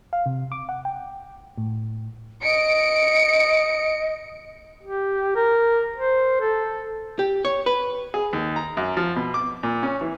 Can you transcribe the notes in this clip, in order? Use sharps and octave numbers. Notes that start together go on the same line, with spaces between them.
F5
C3
D6
F#5
G5
A2
D#5 C#7 D7
G4
A#4
C5
A4
G4
C#5
B4
G#4
D#2
A#5
F#2
F3
B2
D6
A#2
C#4
E3